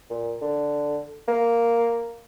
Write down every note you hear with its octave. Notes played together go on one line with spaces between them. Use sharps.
A#2
D3
A#3